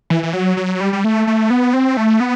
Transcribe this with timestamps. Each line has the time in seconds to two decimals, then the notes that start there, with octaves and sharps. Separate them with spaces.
0.10 E3
0.23 E3
0.33 F#3
0.57 F#3
0.80 G3
0.93 G3
1.04 A3
1.27 A3
1.50 B3
1.74 C4
1.97 A3
2.20 B3